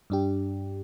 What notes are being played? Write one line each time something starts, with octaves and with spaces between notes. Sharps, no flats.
G2 D4 G4